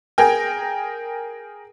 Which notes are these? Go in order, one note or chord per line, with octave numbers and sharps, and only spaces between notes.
G#4 A#4 G5